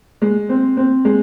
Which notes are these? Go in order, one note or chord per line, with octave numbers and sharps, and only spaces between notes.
G#3
C4
C4
G#3